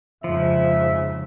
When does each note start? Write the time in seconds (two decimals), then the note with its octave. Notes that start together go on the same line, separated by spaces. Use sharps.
0.24 F2 G#2 C#3 F3 E5